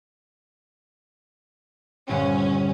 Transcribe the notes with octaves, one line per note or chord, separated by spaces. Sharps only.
A#1 G2 D3 C#4